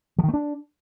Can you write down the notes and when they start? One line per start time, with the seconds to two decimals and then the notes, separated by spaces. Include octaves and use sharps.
0.18 F3
0.24 D#3
0.29 A3
0.34 D4